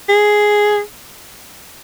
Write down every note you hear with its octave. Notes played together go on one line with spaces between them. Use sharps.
G#4